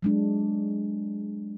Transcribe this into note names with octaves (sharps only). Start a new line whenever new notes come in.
F#3 G#3 D4